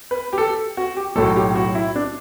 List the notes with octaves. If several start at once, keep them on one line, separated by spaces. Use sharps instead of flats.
B4
G4
A4
F#4
G4
B1 A2 F#3 A4
G4
F#4
E4
D4